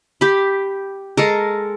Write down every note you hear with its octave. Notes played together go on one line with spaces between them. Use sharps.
G4 B5
G#3 A4 A#4